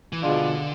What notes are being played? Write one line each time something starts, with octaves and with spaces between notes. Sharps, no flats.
E3
B2 D3 G#3 D4 F4